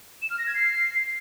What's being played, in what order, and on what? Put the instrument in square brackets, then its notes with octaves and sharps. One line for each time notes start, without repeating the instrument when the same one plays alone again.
[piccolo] E7
F6
A#6
G#6
C7